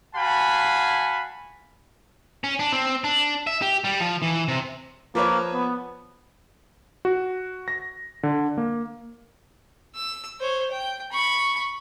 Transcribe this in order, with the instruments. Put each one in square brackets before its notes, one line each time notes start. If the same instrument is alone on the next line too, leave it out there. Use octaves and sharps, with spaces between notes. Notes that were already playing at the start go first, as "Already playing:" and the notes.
[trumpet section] F#4 F5 F#5 G#5 A5 B5
[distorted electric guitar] C#4
D4
C4
D4
E5
G4
G3
F3
E3
C3
[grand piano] F3 B4 C#5 [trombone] A#3
[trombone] B3
[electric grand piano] F#4
A#6
D3
A#3
[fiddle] E6
C5 C#5
G5
B5 C#6